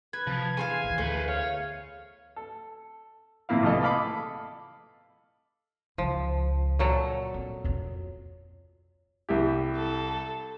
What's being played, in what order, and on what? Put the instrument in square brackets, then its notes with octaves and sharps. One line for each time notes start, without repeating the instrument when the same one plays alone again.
[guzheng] B4 [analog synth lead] G#6
[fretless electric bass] C3 [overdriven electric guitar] F3
[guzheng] E2 C5 F5 [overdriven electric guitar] G#5
[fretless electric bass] A1 D#2
[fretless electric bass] D2 [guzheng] A3 [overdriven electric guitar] B4 C5
[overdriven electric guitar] C#5 [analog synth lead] F5
[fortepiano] A4
E2 A#2 A#3 E4 F5
C2 E3 A3 F4 A4 D#5
A4 D#5 F5 B5 D6
[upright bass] C#2 [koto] F3
[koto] A#2 F#3 A4
[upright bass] C4
F2 C4
[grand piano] C2 E4 G4
[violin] A4